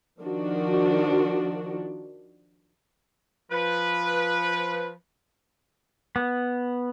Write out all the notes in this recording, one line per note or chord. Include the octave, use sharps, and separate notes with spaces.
D#3 F3 D4 F#4
F3 B4
B3